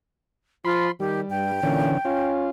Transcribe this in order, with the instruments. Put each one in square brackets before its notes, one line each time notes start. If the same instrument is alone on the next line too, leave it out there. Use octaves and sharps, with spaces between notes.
[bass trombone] F3 [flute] F4 [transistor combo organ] B5 C6
[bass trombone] D#3 [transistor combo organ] G3 [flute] G4
[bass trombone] G2 [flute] G5
[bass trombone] A#2 [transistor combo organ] D3 E3 C#4
[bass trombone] C#4 [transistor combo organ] F4